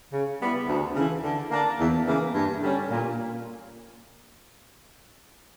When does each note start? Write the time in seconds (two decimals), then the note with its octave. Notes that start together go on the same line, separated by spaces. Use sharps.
0.12 C#3
0.40 G3 B3 E4
0.68 D2
0.95 C#3 E3
1.23 D3
1.51 A#3 D4
1.79 E2
2.07 C#3 E3 A#3
2.34 G2
2.61 D3 G3 C#4
2.90 A#2